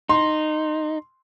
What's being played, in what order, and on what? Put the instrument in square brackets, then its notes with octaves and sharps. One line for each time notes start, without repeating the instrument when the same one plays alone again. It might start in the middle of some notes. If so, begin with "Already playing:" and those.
[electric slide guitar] D#4 [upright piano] C6